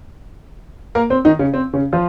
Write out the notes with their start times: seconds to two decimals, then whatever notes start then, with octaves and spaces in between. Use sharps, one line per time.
0.95 A#3 A#4
1.10 C4 C5
1.25 D#3 D#4
1.39 C#3 C#4
1.54 C4
1.73 C#3 C#4
1.93 F3 F4